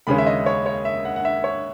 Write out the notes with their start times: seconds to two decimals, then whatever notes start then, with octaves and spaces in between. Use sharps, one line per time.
0.07 D#2 C#3 G#3 C#4 B5
0.18 E5
0.27 D#5
0.46 C#5
0.66 C#5
0.85 E5
1.05 F#5
1.16 F#5
1.25 E5
1.44 C#5